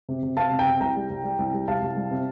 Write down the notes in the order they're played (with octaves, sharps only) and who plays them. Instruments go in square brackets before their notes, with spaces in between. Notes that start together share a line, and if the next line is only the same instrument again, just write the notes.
[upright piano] C3
C3
C3 F5 A5
C3
G5 A#5
C3
C2 G5 A#5
G3
C2
G3
C2
G3
C2 F5 A5
C2
G3
C3